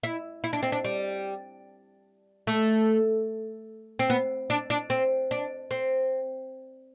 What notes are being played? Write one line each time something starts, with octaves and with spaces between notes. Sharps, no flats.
E4
E4
D4
C4
D4
G3
A3
C4
B3
D4
D4
C4
D4
C4